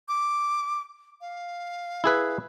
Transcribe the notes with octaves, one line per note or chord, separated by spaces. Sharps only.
D6
F5
E4 G#4 B4